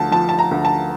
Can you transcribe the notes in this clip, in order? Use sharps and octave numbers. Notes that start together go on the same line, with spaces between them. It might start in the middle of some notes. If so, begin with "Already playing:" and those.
Already playing: D2 F3 A5
F3 A5
A5
A#5
D2
A5